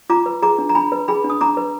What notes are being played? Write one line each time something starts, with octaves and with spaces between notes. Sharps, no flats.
F4 A#5 D6
B4
G#4 A#5 D6
D4
A#5
D4 G#5 B5
B4
G#4 G#5 B5
D4
D#6
D4 A#5 D6
B4